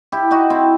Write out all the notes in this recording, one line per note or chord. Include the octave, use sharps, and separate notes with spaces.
E4 G4
D#4 F#4
C4 E4